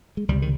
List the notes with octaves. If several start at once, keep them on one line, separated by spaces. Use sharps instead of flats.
G#3
C#2 C3 G3
D#3